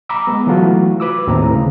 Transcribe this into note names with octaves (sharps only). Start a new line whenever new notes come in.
A#5 B5 D6 E6
G#3 B3
E3 F#3 A3 F4 F#4
B4 D6 E6
D#2 A2 C4 A#5
C#3